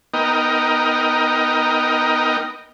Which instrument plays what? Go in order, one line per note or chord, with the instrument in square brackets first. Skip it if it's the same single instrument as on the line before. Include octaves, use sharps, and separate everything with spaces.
[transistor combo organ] B3 D#4 A#4 D#5 G5